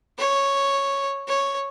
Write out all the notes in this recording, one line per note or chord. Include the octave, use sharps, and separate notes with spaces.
C#5
C#5